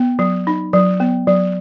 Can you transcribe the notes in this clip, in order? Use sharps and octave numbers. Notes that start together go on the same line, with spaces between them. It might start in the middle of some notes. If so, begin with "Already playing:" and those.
Already playing: B3
F#3
D#4
F#3
B3
F#3